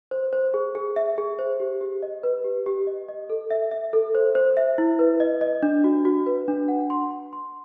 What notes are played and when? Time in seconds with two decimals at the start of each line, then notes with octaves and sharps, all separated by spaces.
0.11 C5
0.33 C5
0.54 G#4
0.75 G#4
0.96 E5
1.18 G#4
1.39 C5
1.60 G4
1.81 G4
2.02 D#5
2.23 B4
2.44 G4
2.66 G4
2.87 D#5
3.08 D#5
3.30 A4
3.51 E5
3.71 E5
3.93 A4
4.15 C5
4.35 C5
4.57 E5
4.78 E4
4.99 B4
5.20 D#5
5.41 D#5
5.63 D4
5.84 F#4
6.05 F#4
6.26 B4
6.48 D4
6.68 F#5
6.90 C6
7.11 C6
7.33 C6